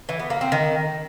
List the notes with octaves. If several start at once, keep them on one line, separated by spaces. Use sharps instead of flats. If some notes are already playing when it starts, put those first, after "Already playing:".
E3
B3
A#3
C4
D#3